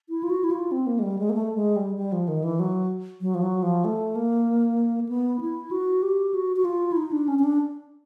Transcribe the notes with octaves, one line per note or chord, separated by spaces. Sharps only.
E4
F4
F#4
E4
F4
C4
A#3
G#3
G3
G#3
A#3
A3
G#3
G3
G3
F3
D#3
E3
F#3
F#3
F3
F#3
F3
A3
A#3
B3
E4
F#4
G4
F#4
F#4
F4
E4
D#4
D4
C#4
C#4
D4